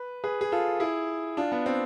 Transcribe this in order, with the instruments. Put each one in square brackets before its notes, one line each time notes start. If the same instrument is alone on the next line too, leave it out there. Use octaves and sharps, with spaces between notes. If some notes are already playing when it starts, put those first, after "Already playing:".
Already playing: [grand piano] B4
G#4 B4
G#4
F4 A4
E4 G#4
D4 F4
B3
C4